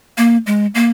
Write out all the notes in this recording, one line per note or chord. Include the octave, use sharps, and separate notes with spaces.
A#3
G#3
A#3